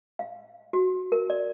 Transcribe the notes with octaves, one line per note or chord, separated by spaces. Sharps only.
F5
F#4
A#4
D5